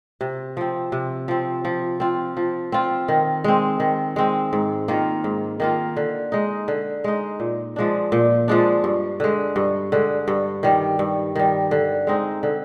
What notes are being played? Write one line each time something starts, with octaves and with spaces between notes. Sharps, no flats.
C3
F3 C4
C3
F3 C4
F3
C4 F4
F3
C4 F4
D#3
G#3 C4
D#3
G#3 C4
G#2
D#3 A#3 F4
G#2
D#3 A#3 F4
D3
G#3 D#4
D3
G#3 D#4
A#2
F3 G#3 D4
A#2
F3 G#3 D4
G2
D3 G#3
G2
D3 G#3
G2
D#3 G3
G2
D#3 G3
D3
G#3 C4 D#4
D3